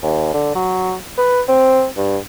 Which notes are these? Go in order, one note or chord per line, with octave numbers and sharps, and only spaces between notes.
D#2
D3
F#3
B4
C4
G2